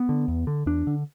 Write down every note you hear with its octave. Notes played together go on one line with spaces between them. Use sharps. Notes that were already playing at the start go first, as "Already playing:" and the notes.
Already playing: B3
D3
E2
D3
E2 D4
D3